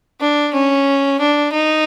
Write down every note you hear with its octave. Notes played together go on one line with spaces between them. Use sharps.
D4
C#4
D4
D#4